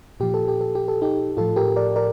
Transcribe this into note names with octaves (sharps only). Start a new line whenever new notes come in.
A#2 F3 G4
A4
G4
A4
G4
A4
D#4 G4
A2 F3 F4 A4
G4 A#4
A#4 D5
A#4 D5